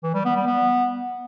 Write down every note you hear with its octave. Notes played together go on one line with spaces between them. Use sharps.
E3
G3
B3
G3
B3